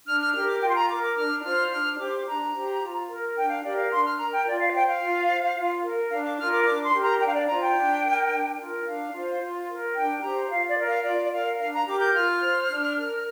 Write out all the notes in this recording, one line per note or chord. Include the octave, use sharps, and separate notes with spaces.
D4 F6
F6
G4 A#4 F6
D6
F4 G5
C6
A#5
A#4 D6
D6
D4 F6
F4 C5 F6
D4 F6
G4 C5 D6
D4 A#5
G4 C5
F4
A#4
D4 G5
F5
G4 A#4 D5
F5
D4 C6
F6
A#4 A#5
G5
F4 D5
F5
C5 G5
F5
F4
C5
F4
A#4
D4 F5
D6
F4 A#4 F6
D6
D4 D6
C6
G4 A#4
A#5
D4 G5
F5
D5
F4 C5 A#5
G5
D4
A#4
D4
F4 A#4
D4 F5
F4 C5
F4
A#4
D4 G5
G4 C5 A#5
F4 F5
D5
A#4
F5
F4 D5
D5
A#4 F5
D4 F5
A#5
G4 A#4 D6
G6
F4 F6
C5
D4
A#4